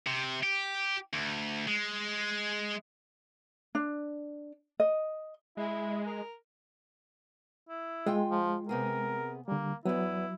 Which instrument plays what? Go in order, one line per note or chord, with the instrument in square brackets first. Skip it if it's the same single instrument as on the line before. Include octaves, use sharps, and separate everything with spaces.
[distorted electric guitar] C3
G4
D2
G#3
[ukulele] D4
D#5
[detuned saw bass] G#3 [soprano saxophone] E4
[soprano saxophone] A#4
[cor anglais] E4
[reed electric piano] G#3 [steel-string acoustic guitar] F4 G5
[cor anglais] F3
[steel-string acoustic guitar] C3 B3 G#4 [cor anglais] A#4
[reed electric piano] D3 G3 [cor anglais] A#3
[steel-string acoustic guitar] E2 B3 [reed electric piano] F#3 [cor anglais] E4